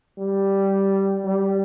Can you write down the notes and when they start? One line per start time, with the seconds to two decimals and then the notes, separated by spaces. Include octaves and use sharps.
0.18 G3
1.25 G3